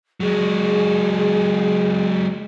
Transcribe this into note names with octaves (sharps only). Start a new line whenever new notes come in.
F#3 G#3 G#4